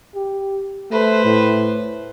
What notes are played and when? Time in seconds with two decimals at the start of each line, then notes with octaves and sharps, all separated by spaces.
0.15 G4
0.91 A3 B4 C5
1.25 A2